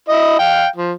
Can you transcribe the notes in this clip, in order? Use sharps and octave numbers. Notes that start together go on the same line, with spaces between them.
E4 D#5
F5 G5
F3